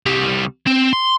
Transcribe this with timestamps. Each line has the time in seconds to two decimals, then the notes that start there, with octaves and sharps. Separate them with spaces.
0.06 C2 G3
0.67 C4
0.93 C6